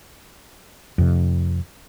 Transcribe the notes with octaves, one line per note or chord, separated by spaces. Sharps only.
F2 C3